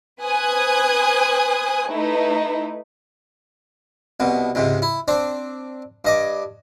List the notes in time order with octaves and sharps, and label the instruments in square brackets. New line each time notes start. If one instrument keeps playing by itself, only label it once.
[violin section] B4 C5 G#5 D#6 F#6 G#6
A3 D#4 E4 B4
[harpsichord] C2 B2
C#2 G#2 C3
E4
C4 D4
G2 D#5 D6